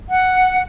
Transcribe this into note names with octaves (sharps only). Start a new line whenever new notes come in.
F#5